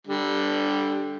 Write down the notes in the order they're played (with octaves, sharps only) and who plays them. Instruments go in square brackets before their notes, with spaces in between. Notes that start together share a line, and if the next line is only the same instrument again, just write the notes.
[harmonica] D3 G3